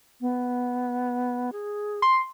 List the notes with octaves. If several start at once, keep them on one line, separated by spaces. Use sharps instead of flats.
B3
G#4
C6